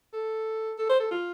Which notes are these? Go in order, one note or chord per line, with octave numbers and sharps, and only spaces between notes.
A4
A4
C5
A4
F4